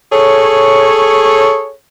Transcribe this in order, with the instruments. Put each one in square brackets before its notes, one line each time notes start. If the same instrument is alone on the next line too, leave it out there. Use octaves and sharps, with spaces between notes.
[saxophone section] G#4 A4 C#5